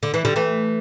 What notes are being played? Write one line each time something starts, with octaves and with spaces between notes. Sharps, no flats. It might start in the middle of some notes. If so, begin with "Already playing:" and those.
D3
E3
D3 G3
E3 A3